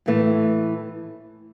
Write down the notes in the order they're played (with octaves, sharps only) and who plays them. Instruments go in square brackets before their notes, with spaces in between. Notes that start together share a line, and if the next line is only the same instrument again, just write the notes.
[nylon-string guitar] A2 E3 A3